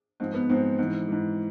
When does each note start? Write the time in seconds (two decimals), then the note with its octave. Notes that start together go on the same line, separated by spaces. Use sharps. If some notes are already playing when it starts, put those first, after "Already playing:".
0.20 G#2 F3 C4
0.34 B3
0.49 G#2 F3 C4
0.78 G#2 E3
1.09 G#2 E3